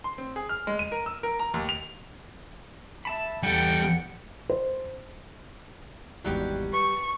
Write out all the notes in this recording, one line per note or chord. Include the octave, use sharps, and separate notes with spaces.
C6
C4
G#4
F6
G#3
D#7
A#4
E6
A#4
A#5
D#2
F7
E5 A5 B5
E2 G3 A4 F#5 G5
C5
G#1 E2 F#3 G3 F#4 G4
B4 C#6